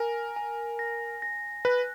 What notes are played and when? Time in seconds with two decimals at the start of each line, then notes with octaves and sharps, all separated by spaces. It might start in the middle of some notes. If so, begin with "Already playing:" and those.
Already playing: A#4 G#5
0.36 G#5
0.79 A#6
1.22 A#6
1.65 B4 F#6